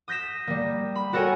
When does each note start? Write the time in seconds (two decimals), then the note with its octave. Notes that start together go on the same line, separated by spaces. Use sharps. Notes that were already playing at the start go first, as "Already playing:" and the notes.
0.08 D#6 G6 A#6 B6 E7
0.47 G3 A#3
0.95 B5
1.13 F#4 A4 A#4 C#5 G5 G#5